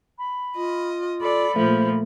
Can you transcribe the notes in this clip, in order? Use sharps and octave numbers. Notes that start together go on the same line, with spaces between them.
B5
F4 D#5
A4 D5 B5
A#2 F3 A3 C5